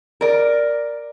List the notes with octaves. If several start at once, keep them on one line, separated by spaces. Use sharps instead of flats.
A#4 D5